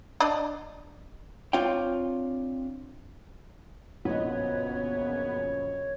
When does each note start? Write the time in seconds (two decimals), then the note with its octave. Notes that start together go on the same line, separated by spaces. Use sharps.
0.20 D4 D5 D#5
1.53 C4 D4 F4 C#5 F5 G5
4.05 A#1 F#2 C#3 B3 C#5 D#5